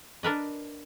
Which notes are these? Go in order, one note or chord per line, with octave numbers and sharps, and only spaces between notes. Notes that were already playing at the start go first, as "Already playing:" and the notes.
D4 A#4 B4 D#5